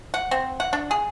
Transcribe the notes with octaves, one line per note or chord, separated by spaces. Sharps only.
F#5
C4
F#5
D4
G#4